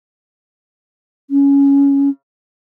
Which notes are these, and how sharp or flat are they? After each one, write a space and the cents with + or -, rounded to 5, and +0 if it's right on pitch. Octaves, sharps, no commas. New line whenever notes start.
C#4 +10